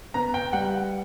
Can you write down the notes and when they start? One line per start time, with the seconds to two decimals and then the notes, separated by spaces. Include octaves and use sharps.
0.14 B3 A#5
0.34 G5
0.53 G3 F#5